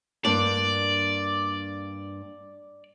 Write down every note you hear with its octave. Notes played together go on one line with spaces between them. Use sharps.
G2 A#3 D4 D5